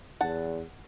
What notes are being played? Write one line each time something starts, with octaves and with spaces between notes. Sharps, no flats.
E2 F#5 A5